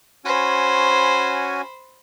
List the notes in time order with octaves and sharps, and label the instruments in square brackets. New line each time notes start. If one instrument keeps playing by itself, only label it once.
[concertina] C#4 F#4 G#5 [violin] C5 B5